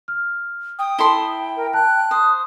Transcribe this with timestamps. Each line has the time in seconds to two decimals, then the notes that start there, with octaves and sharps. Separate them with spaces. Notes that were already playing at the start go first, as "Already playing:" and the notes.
0.08 F6
0.79 G5 D#6
0.99 E4 A4 C6 G7
1.57 A#4
1.74 A5 F#6
2.11 C5 D#6